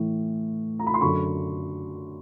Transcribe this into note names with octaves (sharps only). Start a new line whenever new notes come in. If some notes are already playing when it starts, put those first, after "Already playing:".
Already playing: A2 E3
A#5
B5
C6
F#2 D3 B5 C#6